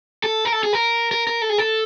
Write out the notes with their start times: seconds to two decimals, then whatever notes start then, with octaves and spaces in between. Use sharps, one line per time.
0.24 A4
0.45 A#4
0.52 A4
0.63 G#4
0.73 A#4
1.11 A#4
1.27 A#4
1.42 A4
1.50 G#4
1.58 A4